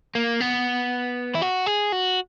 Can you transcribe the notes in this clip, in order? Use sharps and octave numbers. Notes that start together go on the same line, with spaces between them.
A#3
B3
E4
F#4
G#4
F#4